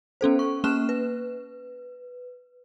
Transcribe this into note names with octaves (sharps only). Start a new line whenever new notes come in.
B3 C#4 A4 C5
C#6
A#3 C#4 C#6 F6 F#6 E7
B4